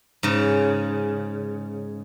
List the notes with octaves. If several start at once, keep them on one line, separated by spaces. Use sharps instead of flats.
G#2 C#3